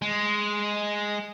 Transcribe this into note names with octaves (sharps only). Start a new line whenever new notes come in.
G#3